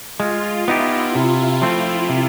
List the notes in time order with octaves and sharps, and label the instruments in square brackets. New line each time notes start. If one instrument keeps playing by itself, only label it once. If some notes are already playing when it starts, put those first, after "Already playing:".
[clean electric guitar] G#3 [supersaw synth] F4
[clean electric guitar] B3 D#4 G4 [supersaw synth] E4
[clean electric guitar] C3
F3 A3 C4
C3